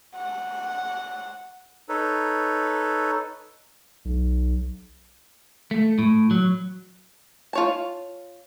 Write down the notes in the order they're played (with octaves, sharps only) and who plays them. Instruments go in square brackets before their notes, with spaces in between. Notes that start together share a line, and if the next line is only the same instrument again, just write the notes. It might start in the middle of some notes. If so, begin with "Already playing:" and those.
[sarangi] F#5
[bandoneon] D#4 A4 B4 C#5
[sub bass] B1
[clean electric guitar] A3
A2
F#3
[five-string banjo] F4 C#5 A5